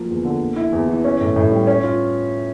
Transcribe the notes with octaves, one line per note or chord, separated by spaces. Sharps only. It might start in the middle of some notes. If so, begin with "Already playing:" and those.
Already playing: F3 A#3
E2
D3
A#3
E4
E2
E3
C#4
A2
A2
G3
C#4
F4